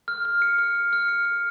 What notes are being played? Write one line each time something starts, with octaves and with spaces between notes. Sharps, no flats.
F6
F6
C#7
F6
F6
F6
C#7
F6